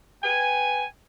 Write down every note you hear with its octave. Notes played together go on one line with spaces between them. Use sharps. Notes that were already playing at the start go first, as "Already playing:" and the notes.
B4 G5 G#5